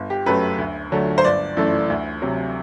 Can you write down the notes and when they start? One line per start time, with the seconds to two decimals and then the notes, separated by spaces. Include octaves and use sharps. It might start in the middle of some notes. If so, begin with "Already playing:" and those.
Already playing: G1
0.10 G4
0.26 F#2 F#3 A3 B4
0.58 D2
0.92 D3 F#3 A3
1.18 C5
1.24 G1 D5
1.57 F#2 E3 A3
1.90 D2
2.22 C3 F#3